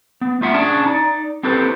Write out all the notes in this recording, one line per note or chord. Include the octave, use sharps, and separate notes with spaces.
B3
A3 F4 E5 F#5
C#4 D4 G#4 D5 A5
D#4 D5
C4 E4 G4 A4 B4 C5